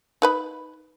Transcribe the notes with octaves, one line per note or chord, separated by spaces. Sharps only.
D#4 B4 B5